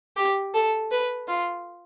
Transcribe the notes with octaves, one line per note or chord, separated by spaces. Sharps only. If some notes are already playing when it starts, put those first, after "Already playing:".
G4
A4
B4
F4